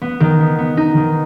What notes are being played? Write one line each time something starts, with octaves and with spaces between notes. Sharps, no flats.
B3
D#3
B3
B3
D#4
D#3